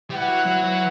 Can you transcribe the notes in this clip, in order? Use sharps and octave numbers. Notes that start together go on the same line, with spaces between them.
G3 E4 B4 F#5
F#3
F#3
F#3